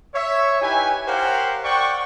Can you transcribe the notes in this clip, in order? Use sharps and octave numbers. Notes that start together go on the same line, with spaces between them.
C#5 E5
D#4 E4 G4 B4 G#5
G4 A#4 C5 C#5 F5 F#5
D5 F#5 G5 C#6